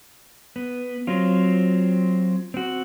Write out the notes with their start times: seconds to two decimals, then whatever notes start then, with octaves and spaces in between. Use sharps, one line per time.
0.56 B3
1.07 F#3 C4 F4
2.54 C4 F#4